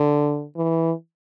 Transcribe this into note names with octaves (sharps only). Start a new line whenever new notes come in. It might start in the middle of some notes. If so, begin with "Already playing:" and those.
Already playing: D3
E3